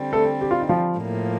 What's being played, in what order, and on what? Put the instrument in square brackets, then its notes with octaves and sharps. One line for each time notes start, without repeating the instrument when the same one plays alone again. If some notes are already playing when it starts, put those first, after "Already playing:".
Already playing: [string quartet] D3 G3 C4
[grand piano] A3 A4
G4
F4
D#4
F3 F4
[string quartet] A2 F3 A#3